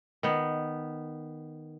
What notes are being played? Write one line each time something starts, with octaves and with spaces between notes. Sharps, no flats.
D#3 B3